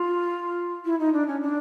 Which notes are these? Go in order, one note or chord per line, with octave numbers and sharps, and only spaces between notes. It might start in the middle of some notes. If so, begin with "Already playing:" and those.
Already playing: F4
E4
D#4
D4
C#4
D4